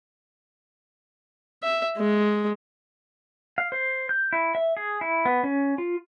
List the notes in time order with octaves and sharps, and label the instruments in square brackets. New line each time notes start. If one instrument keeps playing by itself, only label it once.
[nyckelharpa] E5
G#3
[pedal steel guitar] F5
C5
G6
E4
E5
G#4
E4
B3
C#4
F4